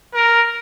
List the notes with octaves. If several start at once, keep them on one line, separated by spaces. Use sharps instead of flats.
A#4